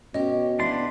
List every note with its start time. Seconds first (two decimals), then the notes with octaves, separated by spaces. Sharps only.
0.14 B2 C#4 G4 D#5
0.59 B3 D4 E4 D5 C6